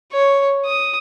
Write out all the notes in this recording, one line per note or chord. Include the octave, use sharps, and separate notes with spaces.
C#5
D#6